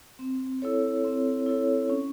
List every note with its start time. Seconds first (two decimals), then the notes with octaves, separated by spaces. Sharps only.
0.19 C4
0.62 E4 A4 C#5
1.05 C4
1.46 E4 A4 C#5
1.90 C#4